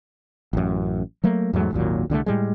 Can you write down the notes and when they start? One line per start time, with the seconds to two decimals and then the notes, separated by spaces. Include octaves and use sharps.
0.53 A1 F#2
1.24 F#3 A3 A#3
1.53 E2 G#2 F#3 A3
1.73 G#1 D#2 A#2 F#3
2.10 C2 D3 G3 A3
2.26 A2 G3 G#3